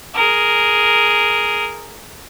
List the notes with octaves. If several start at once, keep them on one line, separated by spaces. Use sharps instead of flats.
G#4 A#4